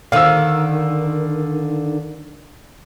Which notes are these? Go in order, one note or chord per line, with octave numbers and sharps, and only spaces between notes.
D3 D#3 F5 E6